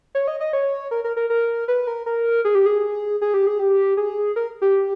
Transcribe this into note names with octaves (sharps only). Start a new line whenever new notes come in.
C#5
D#5
D#5
C#5
A#4
A#4
A#4
A#4
B4
A#4
A#4
G#4
G4
G#4
G#4
G4
G#4
G4
G#4
A#4
G4